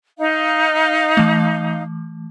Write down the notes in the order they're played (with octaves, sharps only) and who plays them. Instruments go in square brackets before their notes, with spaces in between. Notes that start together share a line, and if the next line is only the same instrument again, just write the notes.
[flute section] D#4 F5
[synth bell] E3 A3